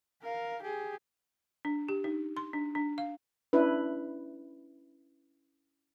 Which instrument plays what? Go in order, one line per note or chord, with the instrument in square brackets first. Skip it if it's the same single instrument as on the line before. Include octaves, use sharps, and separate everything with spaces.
[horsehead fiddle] A#4 F5
G4 G#4
[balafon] D4
G4
D#4
C6
D4
D4
F5
[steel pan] C#4 D4 E4 B4